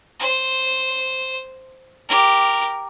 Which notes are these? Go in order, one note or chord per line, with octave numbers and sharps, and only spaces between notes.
C5
G4 A#4